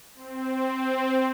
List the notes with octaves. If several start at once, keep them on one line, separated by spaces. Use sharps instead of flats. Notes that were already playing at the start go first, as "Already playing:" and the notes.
C4